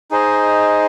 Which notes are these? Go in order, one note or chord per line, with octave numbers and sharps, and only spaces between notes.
D#4 G#4 C5 D#5